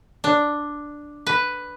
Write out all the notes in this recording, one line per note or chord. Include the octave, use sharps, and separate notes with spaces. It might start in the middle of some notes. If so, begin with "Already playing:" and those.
D4
B4